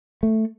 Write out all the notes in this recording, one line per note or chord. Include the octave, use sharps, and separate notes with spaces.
A3